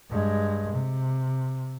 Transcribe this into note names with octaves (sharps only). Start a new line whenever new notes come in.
G2 G#3
C3